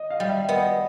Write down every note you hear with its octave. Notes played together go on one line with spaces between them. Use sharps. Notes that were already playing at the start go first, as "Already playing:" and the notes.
Already playing: D#5
F5
G3
E5
B3 D#5